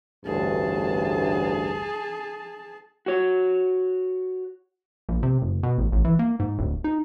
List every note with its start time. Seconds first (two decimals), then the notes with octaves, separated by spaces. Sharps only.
0.25 A1 D2 G2 G#4 A5
3.06 F#4 C#5
5.09 A#1
5.23 C3
5.42 F#1
5.63 B2
5.78 A1
5.92 A1
6.05 E3
6.19 A#3
6.40 G#2
6.59 D1
6.84 D#4